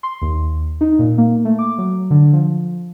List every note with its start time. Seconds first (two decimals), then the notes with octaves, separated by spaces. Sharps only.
0.03 C6
0.21 D#2
0.81 D#4
0.99 A#2
1.18 A#3
1.45 A3
1.59 D6
1.78 F#3
2.10 D3
2.33 F3